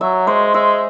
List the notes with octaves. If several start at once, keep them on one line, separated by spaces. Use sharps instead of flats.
F#3 E5
G#3 C5
G#3 E5